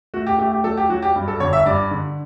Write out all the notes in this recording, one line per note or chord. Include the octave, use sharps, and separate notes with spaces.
A3 F#4
G4
A3 G4
G4
F#3 A4
G4
F#3 F#4
G4
G2
A4
G1 C#5
E5
G2 D5
D3